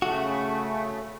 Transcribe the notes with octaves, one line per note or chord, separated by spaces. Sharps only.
C#3 A3 F#4